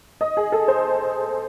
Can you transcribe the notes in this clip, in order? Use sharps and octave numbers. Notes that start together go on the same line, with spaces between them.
D#5
G#4
A4
C5